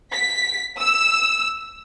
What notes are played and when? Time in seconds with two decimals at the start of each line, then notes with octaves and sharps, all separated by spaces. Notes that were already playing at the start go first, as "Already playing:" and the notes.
0.11 B6
0.80 E6